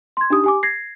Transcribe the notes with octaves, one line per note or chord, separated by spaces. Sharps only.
C6 G#6
D4 D#4 G4 D#6
G4 G#5 D6
G#6 A#6 C7